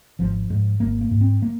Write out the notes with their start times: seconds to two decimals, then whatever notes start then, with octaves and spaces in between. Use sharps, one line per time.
0.19 G#1 F3
0.50 G#2
0.80 G#1 A#3
1.01 A#3
1.11 G#2
1.21 C4
1.42 A#3